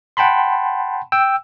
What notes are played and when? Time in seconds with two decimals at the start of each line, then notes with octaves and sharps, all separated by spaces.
0.17 F#5 G5 A5 B5 C6
1.12 G5 E6